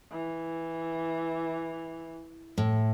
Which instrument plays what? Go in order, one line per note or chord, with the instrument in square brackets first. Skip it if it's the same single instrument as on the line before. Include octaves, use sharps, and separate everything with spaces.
[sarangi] E3
[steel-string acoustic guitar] A2